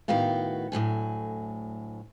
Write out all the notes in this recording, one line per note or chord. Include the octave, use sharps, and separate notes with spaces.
A2 D#3 B3 F#4 F5 G5
D2 A2 F#3 G#5